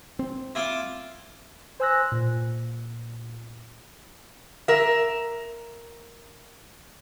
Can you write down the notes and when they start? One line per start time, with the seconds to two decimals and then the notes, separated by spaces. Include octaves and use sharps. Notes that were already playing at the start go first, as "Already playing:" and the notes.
0.19 C4
0.55 E4 F4 D6
1.80 C5 G#5 E6 F#6 A#6
2.12 A#2
4.68 A#4 E5